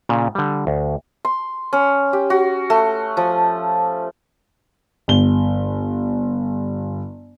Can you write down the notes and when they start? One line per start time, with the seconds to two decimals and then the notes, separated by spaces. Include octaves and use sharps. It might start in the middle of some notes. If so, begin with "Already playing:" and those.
0.09 A#2 C#3
0.35 D3 G3
0.67 D2
1.25 C6
1.73 C#4
2.13 G4
2.30 F#4
2.70 A3
3.17 F3
5.08 G1 G7